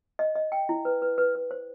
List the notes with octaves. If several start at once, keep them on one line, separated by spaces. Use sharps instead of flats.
D#5
D#5
G5
E4
B4
B4
B4
B4
C5